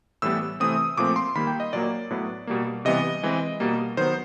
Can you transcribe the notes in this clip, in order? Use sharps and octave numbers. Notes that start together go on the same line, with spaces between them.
A2 E3 G3 B3 E6
C3 E3 A3 C4 D#6
A#2 F3 A3 C4 D6
C6
D#3 G3 A#3 B5
G5
D#5
A#2 F#3 A#3 D5
A2 F#3 B3
B2 G3 A#3
C3 E3 G3 B3 D#5
E3 G#3 C4
B2 G3 A#3
D#3 F#3 B3 C5